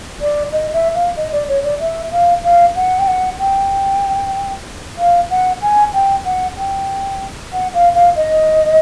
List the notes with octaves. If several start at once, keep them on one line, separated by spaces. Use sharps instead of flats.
D5
D#5
E5
F5
D#5
D5
C#5
D5
E5
F5
F5
F#5
G5
F#5
G5
F5
F#5
G#5
G5
F#5
G5
F#5
F5
F5
D#5